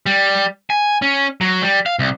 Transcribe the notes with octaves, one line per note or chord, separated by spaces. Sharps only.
G3
G#5
C#4
F#3
G3
F5
C2